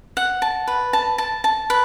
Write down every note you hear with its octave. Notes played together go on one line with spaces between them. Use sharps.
F#5
A5
B4
A5
A5
A5
B4